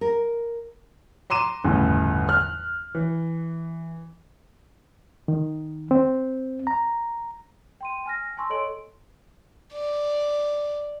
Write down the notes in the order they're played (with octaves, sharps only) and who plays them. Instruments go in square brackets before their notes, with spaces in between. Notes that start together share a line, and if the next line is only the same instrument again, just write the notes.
[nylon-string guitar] A#4
[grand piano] A#5 C6 D6 D#7 E7
G1 E2 A2 C#3 E3
F6 F#6
E3
[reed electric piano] D#3
C4
A#5
[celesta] G5 C6 D#7
G#5 F6 A#6
G#5 A5 C6 C#6 E6
A4 C#5 D#5 C6 D7 F#7
[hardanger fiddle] D5